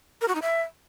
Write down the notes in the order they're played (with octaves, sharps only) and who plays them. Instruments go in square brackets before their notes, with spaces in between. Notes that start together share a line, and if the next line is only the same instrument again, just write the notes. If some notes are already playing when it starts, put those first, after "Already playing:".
[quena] A#4
F#4
D#4
E5